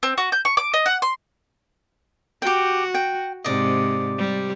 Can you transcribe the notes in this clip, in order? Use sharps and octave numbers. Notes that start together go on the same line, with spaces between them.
C4
F#4
G6
C#6
D6
D#5
F#5
C6
F#4 G4 G5
G5
G#2 C3 D5 D#5
C3 G3